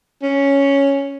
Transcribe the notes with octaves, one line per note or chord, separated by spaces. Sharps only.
C#4